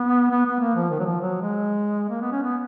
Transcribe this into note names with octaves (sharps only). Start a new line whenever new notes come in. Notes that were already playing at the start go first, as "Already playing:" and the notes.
Already playing: B3
B3
B3
A#3
F3
D#3
F#3
F3
F#3
G#3
A#3
B3
C#4
B3